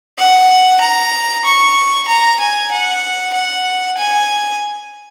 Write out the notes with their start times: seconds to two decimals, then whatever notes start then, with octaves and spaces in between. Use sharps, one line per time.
0.19 F#5
0.81 A#5
1.45 C#6
2.08 A#5
2.40 G#5
2.72 F#5
3.34 F#5
3.98 G#5